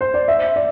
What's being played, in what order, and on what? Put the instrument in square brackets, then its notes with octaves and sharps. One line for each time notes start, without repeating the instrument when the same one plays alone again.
[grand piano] C5
D5
E5
D5